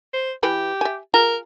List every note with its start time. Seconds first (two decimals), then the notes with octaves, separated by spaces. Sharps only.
0.13 C5
0.43 E3 E4 G4 B4
0.81 E5 G#5
1.14 F4 G#4 A#4 A#5